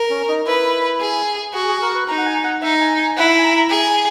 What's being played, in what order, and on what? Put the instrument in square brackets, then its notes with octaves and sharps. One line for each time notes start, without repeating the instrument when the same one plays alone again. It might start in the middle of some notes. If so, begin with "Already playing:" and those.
Already playing: [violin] A#4
[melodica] C#4
D#4
[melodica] E4 [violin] B4
[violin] G#4
[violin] F#4 [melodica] G#4
[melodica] G#4
A#4
B4
[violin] D#4 [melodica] A#5
[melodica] F#5
G#5
F#5
[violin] D#4 [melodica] E5
[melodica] G#5
G#5
[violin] E4 [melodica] F#5
[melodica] G#5
A#5
A#5
[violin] G#4 [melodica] G#5